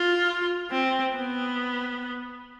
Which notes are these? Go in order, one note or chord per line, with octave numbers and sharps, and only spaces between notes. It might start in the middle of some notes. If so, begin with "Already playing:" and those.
Already playing: F4
C4
B3